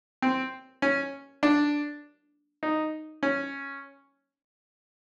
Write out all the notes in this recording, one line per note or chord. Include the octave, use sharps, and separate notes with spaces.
C4
C#4
D4
D#4
C#4